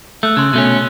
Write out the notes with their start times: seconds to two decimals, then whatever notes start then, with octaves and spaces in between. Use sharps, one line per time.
0.23 A3 E6 F#6
0.37 C#3 C6 F#6
0.53 B2 A3 C#4